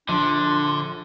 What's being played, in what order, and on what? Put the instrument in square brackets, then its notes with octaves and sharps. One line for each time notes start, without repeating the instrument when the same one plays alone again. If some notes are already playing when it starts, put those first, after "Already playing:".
[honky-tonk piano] A#1 [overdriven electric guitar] D3 [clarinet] D4 [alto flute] C6